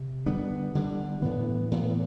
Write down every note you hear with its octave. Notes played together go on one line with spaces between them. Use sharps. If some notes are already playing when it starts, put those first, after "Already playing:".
Already playing: C3
D3 G3 B3 D4
D3 G3 B3 D4
A2 E3 B3
A2 E3 B3